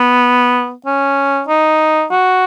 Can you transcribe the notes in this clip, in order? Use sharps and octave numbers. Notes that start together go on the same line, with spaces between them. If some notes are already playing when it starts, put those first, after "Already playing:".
Already playing: B3
C#4
D#4
F#4